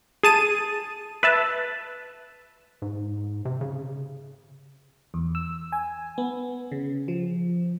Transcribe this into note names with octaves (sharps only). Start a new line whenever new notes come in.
G#4 A5 D#7
B4 E5 A5
G#2
C3
C#3
E2
E6
G#5
B3
C#3
F3